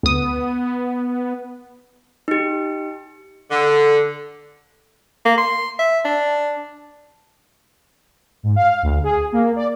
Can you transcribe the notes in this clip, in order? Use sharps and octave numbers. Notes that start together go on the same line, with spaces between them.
D2 B3 D#6
D#4 G4
D3
A#3
C6
E5
D4
G#2
F5
D2
G#4
A#3
D5